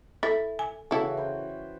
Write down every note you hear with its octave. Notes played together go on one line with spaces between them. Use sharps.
E4 A4
G#5
C#3 E3 E4 F#4 A4
B4 C5 G5